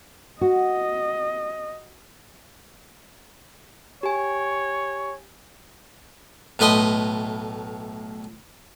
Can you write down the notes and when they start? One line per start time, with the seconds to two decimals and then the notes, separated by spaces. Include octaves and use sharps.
0.41 F#4 D#5
4.03 G4 C#5 G#5
6.59 B1 A2 B4 D#5 C6 D#6